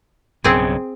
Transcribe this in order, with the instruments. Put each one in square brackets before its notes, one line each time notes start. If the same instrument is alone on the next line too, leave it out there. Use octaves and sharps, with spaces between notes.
[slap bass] B1 G2 C#3 [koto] C4 G#4